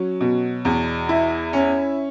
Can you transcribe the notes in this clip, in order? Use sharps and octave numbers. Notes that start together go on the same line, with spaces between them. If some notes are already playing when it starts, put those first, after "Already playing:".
Already playing: F#3 C#4
B2
E2
E4
C#4